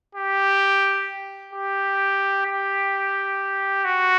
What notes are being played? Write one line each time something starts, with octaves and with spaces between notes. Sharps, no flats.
G4
G4
G4
F#4